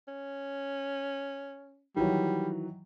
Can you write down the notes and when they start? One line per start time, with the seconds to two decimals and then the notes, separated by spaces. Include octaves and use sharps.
0.08 C#4
1.96 D#3 E3 F#3 G3